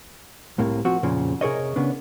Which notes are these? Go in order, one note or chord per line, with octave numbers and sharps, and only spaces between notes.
C2 A2 C3 A#3
F3 C4 F#4
F2 A#2 C#3 F3
C3 G#4 A#4 C#5 D#5
C#3 B3 C#4 D4